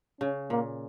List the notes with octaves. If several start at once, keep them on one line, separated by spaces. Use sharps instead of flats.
C#3 C#4
A#2 A#3